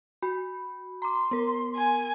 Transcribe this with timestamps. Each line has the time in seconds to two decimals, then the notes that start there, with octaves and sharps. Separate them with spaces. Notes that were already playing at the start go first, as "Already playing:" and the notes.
0.22 F#4 B5
1.02 A#5 C6 D6
1.31 B3 A#4
1.76 G#5